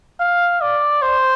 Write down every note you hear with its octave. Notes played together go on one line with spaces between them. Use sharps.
F5
D5
C5